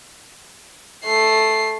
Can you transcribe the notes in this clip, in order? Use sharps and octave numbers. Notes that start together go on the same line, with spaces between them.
A3 C7